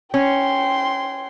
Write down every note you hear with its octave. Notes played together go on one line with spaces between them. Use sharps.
C#4 G5 C6